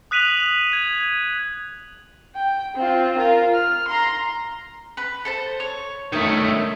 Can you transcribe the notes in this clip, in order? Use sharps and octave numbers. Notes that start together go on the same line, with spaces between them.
D#6 F#6 B6 D#7 F7 F#7
G#6
G5
C4 F4
F4 A#4
F6
A#5 C6
B4 B5
A4 C5 A5
C#5
D#3 A3 C#5 D#5